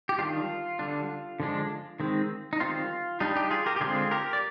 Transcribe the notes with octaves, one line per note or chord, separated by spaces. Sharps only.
G4
D#3 G3 D4 F4
D3 G3 D4
D3 F3 G#3 D4
D#3 G#3 C4
D#4
D#3 G3 C4 F4
G3 D4 D#4
D#4 G4
F4 G#4
G4 A#4
G4
D3 G#3 C4 F4 G#4
G4 A#4
D5